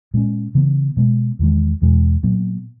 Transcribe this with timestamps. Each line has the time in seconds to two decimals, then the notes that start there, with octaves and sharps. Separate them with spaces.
0.14 A#2 G#3 C#4
0.55 C#3 E3 B3
0.97 B2 G#3 B3
1.39 E2 D#3 G#3
1.82 E2 B2 G#3
2.23 A#2 F#3 B3